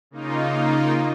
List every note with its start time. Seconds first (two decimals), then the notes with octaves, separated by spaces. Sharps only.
0.11 C#3 A#3 D#4 F4